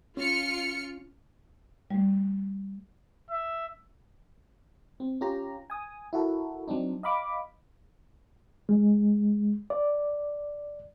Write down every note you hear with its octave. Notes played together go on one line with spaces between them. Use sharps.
C#4 F4 F6 C#7
G3 A3
E5
C4
C#4 F4 G4 A#5
G#5 D#6
E4 F#4 A4 A#4
F#3 C4 D4 D#4
D#5 F5 B5 D6
G#3
D5